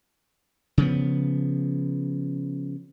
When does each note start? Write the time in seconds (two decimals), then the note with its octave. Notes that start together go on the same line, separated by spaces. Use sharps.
0.78 C#3 F3 B3